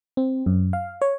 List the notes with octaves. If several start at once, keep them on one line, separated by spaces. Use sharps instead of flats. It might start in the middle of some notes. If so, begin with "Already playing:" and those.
C4
F#2
F5
C#5